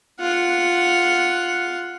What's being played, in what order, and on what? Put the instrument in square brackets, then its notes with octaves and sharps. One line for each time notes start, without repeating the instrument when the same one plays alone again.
[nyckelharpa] F4 F#5